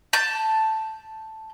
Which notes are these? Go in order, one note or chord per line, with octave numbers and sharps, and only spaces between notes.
A5 G6